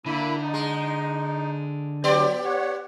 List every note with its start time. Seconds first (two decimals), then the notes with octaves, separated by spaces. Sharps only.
0.06 D3 A#3 E4 B5
0.40 D#4
0.54 G#3
2.04 F#3 B3 G4 D5
2.44 C#5 F#5